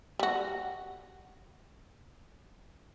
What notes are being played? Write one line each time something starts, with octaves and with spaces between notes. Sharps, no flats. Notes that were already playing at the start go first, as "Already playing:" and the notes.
G3 F#4